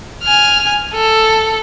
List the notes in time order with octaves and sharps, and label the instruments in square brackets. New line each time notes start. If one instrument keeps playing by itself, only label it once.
[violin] G#5 F6
A4